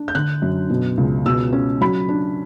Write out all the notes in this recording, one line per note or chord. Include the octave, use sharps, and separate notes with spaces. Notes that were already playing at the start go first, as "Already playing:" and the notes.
Already playing: D4
G6
D3 F#6
F#2
B2
C#2
B2 E6
C#4
F#3 B5
D4